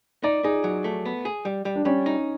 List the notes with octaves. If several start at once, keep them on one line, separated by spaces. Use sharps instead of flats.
D#4 D5
D#4 G#4
F#3
A3
B3
G#4
G3
G3
D4
G3 C#4
D#4